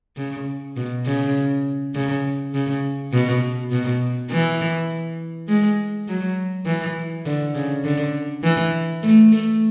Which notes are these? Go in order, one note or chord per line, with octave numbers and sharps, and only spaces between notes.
C#3
B2
C#3
C#3
C#3
B2
B2
E3
G#3
F#3
E3
D3
C#3
D3
E3
A3
A3